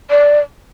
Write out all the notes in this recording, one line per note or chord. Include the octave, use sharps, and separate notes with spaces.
D5